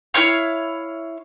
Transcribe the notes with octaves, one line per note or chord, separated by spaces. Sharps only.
E4 A#4 C#5 F5